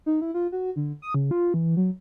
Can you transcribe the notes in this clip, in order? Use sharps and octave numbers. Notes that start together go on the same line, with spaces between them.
D#4
E4
F4
F#4
D3
D#6
C#3
F4
E3
F#3